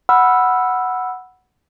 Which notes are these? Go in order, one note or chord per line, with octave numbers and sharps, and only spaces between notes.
F#5 B5 E6 F6